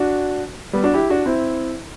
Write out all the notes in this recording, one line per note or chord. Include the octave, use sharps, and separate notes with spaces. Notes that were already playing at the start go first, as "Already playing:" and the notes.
Already playing: D4 F#4
G3 B3
D4 F#4
E4 G4
D4 F#4
C4 E4